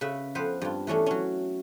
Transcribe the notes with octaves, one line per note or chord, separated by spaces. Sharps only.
C#3 B4 E5 F#5
F2 B3 B4 C5 F5
G2 F4
E3 A3 C#4 D4
F#3 C#4